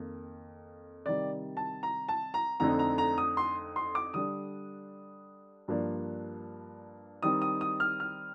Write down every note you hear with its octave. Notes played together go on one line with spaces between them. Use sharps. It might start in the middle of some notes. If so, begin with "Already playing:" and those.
Already playing: F2 D#3 A#3
C3 D#3 G3 D5
A5
A#5
A5
A#5
F2 D3 A3 C4 D#4 A#5
A#5
A#5
D#6
C6
C6
D6
D3 G3 D4 D#6
G2 F3 A#3 D4
D#3 G3 C4 D#4 D#6
D#6
D#6
F6
F6